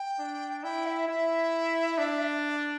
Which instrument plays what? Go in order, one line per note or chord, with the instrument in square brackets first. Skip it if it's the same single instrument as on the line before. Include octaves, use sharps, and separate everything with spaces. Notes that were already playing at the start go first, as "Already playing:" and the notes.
Already playing: [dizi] G5
[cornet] D4
[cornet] E4 [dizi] G5
[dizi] E5
[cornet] E4 [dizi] E5
[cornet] D4